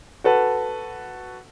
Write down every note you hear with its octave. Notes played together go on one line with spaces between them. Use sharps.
F#4 A4 B4